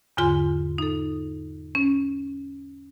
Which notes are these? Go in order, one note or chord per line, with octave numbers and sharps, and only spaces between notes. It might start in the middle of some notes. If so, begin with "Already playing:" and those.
E2 G#2 D3 F4 G#5 C6
D#4 A4
C#4